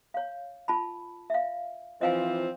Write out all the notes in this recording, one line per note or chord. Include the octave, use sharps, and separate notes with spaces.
C#5 F5
F4 A5 B5
E5 F5
E3 F3 C4 D#5 F5 G#5